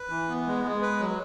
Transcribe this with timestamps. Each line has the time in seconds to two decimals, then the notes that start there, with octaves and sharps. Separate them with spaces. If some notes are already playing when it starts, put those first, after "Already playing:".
Already playing: B4
0.09 E3
0.29 B3
0.47 G#3
0.64 G#3
0.82 B4
1.00 F#3